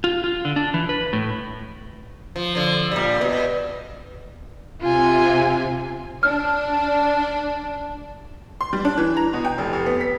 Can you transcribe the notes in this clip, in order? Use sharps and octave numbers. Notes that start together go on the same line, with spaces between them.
F4
F4
D3
D4
E3
B4
A2
F3
D3 F3
A#2 G3
B2
C3 F4 G#5
D4 F6
C6
G3
D4
E3
A#5
B2
G5
F1
F1
B3
B6